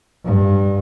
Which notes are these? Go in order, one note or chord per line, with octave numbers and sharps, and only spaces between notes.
G2